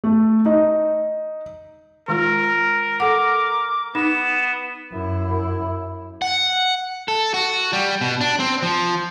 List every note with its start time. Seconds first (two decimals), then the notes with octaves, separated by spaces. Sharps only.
0.04 A3
0.46 D#4
2.08 D#3 G#3 F4 A#4
3.00 A4 F#5 D6
3.95 B3 D#4 E7
4.93 F#2 E4
6.22 F#5
7.08 A4
7.34 F#4
7.73 G3
8.01 B2
8.21 D4
8.40 C4
8.63 F3